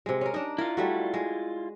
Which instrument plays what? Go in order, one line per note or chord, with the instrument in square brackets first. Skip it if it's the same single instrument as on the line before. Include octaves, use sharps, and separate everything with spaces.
[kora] C3 G#3
C#4 A#4
D4 D#4
[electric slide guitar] E4 F4 [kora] A#4
[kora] G3 A3 F#4
G#3